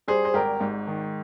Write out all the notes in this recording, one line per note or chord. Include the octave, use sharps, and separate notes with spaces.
G3 G#4 C5
C5
G#1 G4 A#4
G#2
D#3